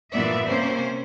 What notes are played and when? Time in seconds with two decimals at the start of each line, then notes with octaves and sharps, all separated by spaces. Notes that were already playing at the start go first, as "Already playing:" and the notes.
0.12 G2 A#2 E3 B3 D5 E5
0.45 C3 A#3 C#4 C5